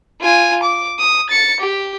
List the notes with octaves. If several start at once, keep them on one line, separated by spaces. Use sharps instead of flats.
F4 G#5
D6
D#6
A6 C#7
G4